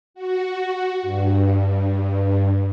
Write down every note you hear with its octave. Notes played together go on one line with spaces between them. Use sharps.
F#4
G2